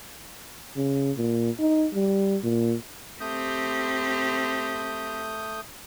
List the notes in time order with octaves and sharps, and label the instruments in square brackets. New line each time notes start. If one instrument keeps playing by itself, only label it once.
[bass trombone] C#3
A#2
D#4
G3
A#2
[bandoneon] A3 D#6 G6 [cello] C4 G4